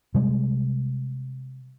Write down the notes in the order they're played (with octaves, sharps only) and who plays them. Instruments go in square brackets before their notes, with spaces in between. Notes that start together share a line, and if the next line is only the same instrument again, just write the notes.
[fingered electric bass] C3 G3 G#3